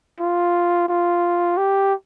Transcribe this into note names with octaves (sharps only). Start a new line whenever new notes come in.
F4
F4
G4